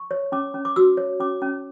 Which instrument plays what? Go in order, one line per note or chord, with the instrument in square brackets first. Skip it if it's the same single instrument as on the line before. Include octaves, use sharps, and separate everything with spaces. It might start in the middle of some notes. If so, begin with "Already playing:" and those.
Already playing: [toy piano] C#6
C#5
C#4 D6
C#4
D6
F#4 E6
C#5
C#4 D6
C#4